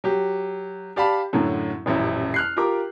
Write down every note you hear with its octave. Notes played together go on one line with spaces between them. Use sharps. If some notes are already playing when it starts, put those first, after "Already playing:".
F#3 G4
G4 D5 F5 A5 B5
F#2 A2 D3 F#3
D#1 A1 F#2 E4
F6 F#6 C7
F4 G4 A#4 A#5 D6